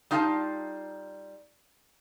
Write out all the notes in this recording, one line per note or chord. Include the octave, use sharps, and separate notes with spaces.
G3 D#4 F4 F5 G5 A5